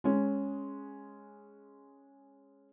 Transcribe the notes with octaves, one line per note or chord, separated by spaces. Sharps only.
G#3 C#4